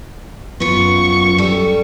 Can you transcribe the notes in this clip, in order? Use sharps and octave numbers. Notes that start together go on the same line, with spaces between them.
F#2 B3 F4 C#6
G3 A4